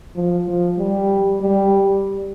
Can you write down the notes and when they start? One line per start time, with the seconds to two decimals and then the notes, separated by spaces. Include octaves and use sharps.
0.15 F3
0.47 F3
0.78 G3
1.42 G3